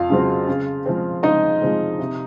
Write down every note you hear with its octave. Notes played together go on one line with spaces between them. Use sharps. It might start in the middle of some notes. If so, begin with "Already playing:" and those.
Already playing: F2 F4 F5
C#3 F#3 C4
C#3
F3 G#3 C4
C#3 D#4 D#5
F3 G#3 C4
C3